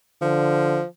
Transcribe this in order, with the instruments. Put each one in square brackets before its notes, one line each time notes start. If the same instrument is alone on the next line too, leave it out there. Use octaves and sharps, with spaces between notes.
[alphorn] D3 [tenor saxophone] F3